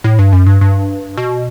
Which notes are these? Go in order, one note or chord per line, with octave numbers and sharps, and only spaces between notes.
A2
G2
F#2
G2
G2
B2